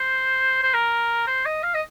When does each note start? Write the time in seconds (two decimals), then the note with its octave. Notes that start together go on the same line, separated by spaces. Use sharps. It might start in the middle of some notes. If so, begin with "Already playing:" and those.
Already playing: C5
0.63 C5
0.74 A#4
1.27 C5
1.45 D#5
1.63 F5
1.74 D#5